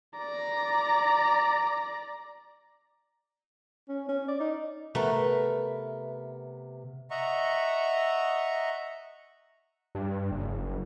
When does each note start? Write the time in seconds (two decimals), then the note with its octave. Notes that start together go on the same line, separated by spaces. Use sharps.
0.18 D5 A#5
3.89 C#4
4.09 C#4
4.28 D5
4.40 D#4
4.95 C3 A3 B3 A#4 B4
7.11 D#5 E5 F#5 A#5 C#6
9.95 G2
10.32 F#1